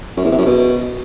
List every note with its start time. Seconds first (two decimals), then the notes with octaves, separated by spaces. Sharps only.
0.17 F#2
0.24 E2
0.31 C3
0.38 F#2
0.45 B2